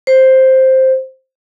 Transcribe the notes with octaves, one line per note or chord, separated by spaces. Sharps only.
C5